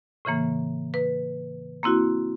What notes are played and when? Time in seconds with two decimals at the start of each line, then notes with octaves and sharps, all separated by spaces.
0.25 A2 C#3 E3 A#3
0.94 B4
1.83 A#3 C4 E4 F#4